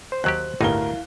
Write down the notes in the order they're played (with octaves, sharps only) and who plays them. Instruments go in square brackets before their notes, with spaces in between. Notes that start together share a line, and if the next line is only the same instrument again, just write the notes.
[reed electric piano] C5
[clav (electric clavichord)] D#2 F#3 G4 [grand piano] F#6
[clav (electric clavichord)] G1 A2 D#4 [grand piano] D2 A#4 G7 [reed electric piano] E4 F5